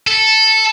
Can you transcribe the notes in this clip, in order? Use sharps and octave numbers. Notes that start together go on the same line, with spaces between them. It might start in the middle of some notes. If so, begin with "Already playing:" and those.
A4